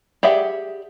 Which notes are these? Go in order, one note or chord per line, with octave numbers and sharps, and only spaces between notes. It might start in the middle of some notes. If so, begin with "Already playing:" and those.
G4 G#4 D5 E5 F#5